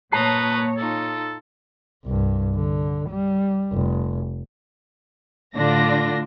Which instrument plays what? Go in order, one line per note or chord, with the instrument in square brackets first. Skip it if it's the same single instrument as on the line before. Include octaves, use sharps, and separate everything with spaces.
[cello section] A#2 C#5 [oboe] B4 [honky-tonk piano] A5 C7 [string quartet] A#5 D#6 G6
[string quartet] D#4 F4 [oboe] A4
[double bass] C2 G2
D3
G3
F1
[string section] A2 D3 D4 F4 A#6